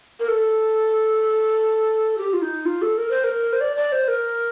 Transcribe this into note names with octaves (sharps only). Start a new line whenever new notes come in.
A#4
A4
G4
F4
D#4
F4
A4
A#4
C5
A#4
C5
D5
D5
C5
A#4